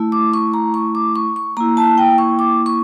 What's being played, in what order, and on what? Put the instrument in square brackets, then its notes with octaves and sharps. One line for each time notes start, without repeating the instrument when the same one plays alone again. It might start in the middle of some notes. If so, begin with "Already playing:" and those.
Already playing: [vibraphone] A3 E4
D6
C#6
A#5
C#6
D6
C#6
C#6
A#3 E4 A#5
A5
G5
C#6
D6
C#6